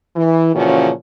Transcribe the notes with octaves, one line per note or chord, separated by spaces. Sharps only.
E3
A#2 C#3 E3 F3 C#4 F#4